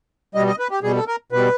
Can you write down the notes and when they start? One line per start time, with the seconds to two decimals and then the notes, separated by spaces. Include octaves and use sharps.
0.35 B2 G3 D#5
0.47 D#5
0.59 B4
0.71 G4
0.83 B2 G3 G#4
0.96 A4
1.08 A#4
1.32 B2 G3 B4